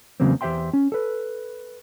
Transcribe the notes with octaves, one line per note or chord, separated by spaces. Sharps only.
E2 C#3 F#3 A#3 C4
E2 G4 C5 E5 G5 C6
C#4
A4 B4